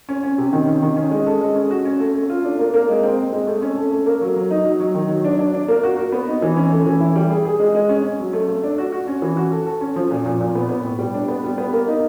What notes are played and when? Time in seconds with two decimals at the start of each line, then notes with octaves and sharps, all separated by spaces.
0.09 C#4
0.23 C#4
0.38 C3
0.53 D#3
0.68 C#4
0.82 D#3
0.96 C#4
1.11 G#3
1.26 A4
1.41 G#3
1.56 C#4
1.71 F#4
1.85 C#4
2.00 A3
2.14 A3
2.30 F4
2.44 D4
2.59 A#3
2.74 A#3
2.89 G#3
3.03 C4
3.18 C4
3.32 G#3
3.47 A3
3.62 C#4
3.77 A4
3.92 A3
4.06 A#3
4.21 F#3
4.36 F#3
4.51 D#4
4.65 F#3
4.80 F#3
4.95 D#3
5.10 F#3
5.24 D4
5.39 D4
5.54 D4
5.68 A#3
5.83 F#4
5.97 F#4
6.12 B3
6.28 D#4
6.42 E3
6.57 C#4
6.72 A3
6.86 E3
7.01 E4
7.15 G3
7.30 G#4
7.45 G#4
7.60 G#3
7.75 G#3
7.89 C#4
8.04 C#4
8.19 F#3
8.33 A3
8.48 A3
8.63 D4
8.78 F#4
8.92 F#4
9.07 C#4
9.22 E3
9.37 F#4
9.52 A4
9.66 A4
9.81 C#4
9.96 F3
10.10 A#2
10.26 A#2
10.40 A#2
10.55 B3
10.69 B3
10.84 A2
10.99 G3
11.14 D4
11.28 B3
11.43 G3
11.58 B3
11.73 A#3
11.88 D#4